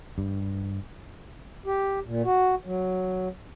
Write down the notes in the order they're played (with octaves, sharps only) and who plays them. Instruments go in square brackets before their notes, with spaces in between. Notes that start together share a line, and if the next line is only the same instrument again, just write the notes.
[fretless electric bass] G2
[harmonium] G4
A#2
F#4
F#3